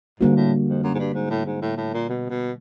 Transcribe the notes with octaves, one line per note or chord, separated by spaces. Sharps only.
G#2 D3 G3 A#3 D4 F#4
A2
F2
F#2
G#2
G2
G#2
A2
G#2
A2
A2
A#2
B2
B2